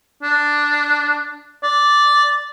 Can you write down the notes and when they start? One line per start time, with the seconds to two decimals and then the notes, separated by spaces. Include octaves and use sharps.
0.23 D4
1.63 D5